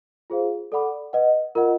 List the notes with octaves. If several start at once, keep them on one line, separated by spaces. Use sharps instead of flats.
F4 G#4 C5 F5
A4 D5 F#5 B5 D6
B4 D#5 F#5
F4 A#4 D#5 F#5